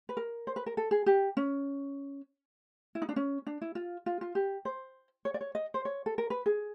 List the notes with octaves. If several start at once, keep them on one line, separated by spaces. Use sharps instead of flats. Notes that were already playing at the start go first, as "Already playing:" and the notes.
B4
A#4
C5
B4
A#4
A4
G#4
G4
C#4
E4
D#4
D4
C#4
D4
E4
F4
F4
F4
G4
C5
C#5
D5
C#5
D#5
C5
C#5
A4
A#4
B4
G#4